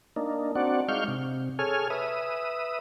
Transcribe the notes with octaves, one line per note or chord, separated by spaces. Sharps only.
A#3 D4 D#4
C4 D4 F#4 D5 F#5
G#3 D#4 F5 C#6 F6 G6
C3
G#4 A4 C#5 G#5 F6
B4 E5 D#6